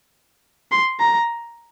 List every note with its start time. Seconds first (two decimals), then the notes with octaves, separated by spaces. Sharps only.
0.72 C6
1.00 A#5